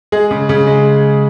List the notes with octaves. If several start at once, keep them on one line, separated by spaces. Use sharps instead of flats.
G#3 G#4
C#3
C#3 G#4
G#3